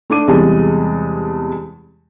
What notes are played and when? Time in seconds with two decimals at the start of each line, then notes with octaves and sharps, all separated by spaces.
0.10 A3 D4 D6 D#7
0.28 E2 C3 G3 G#3 A5